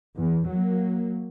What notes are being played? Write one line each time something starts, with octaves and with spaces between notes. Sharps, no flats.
E2
F#3 A#3